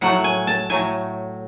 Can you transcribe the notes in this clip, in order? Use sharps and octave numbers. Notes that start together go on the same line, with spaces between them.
A2 F#3 A3 F#5
G#5
A5
A2 F#3 A3 G#5